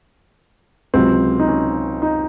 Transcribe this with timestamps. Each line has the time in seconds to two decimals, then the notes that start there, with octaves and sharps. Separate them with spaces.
0.94 C#2 C3 F#3 C4
1.40 D#4
1.48 C#4
2.02 D#4